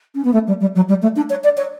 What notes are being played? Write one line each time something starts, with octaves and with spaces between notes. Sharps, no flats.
C#4
B3
A3
G3
G3
F#3
G3
A3
D4
C#5
D5
C#5